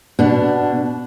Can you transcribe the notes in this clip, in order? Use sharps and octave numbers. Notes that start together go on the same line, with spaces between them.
B2 D4